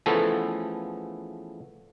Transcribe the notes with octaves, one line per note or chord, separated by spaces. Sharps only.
C#3 E3 F3 A3 B3 A4